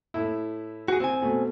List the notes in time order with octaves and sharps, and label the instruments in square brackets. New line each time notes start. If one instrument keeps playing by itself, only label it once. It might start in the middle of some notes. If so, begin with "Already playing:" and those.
[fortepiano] A2 E4
[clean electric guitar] F#4 G#4
[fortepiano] C2 [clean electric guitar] C4 G#5
[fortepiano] B2 A3